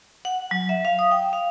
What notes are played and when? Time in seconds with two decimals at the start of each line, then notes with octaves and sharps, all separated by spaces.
0.25 F#5
0.51 F#3
0.69 E5
0.85 F5
0.99 D#6
1.11 G5
1.33 F5